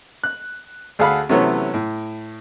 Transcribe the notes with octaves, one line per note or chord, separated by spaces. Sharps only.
F#6
D2 G#4 A4 F5 F#5 B5
C3 E3 F#3 A3 B3 C#4
A2